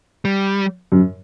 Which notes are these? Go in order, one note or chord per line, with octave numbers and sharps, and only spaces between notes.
G3
F#2